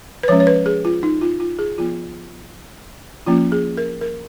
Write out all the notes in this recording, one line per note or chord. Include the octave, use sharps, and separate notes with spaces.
B4
F3 G#3 C#4 C#5
C#5
B4
G#4
F4
D#4
F4
F4
G#4
F3 B3 F4
F3 A#3 C#4 F4
G#4
A#4
A#4